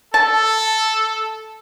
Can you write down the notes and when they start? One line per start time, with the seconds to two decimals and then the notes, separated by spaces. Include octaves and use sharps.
0.14 A4 A5